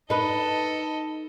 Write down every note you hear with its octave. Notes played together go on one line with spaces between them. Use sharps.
D#4 A4 B4 D#5